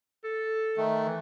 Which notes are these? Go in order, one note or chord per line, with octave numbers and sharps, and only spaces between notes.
A4
D#3 A3
E3